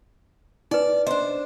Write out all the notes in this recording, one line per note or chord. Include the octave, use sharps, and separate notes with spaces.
D#4 B4 D5
D4 C5 D#5